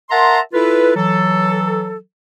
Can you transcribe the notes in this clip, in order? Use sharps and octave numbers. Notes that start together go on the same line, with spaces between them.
A#4 E5 F#5 A5 A#5 C6
E4 F4 A4 B4
E3 F#3 A4